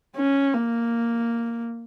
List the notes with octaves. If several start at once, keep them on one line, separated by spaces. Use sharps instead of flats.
C#4
A#3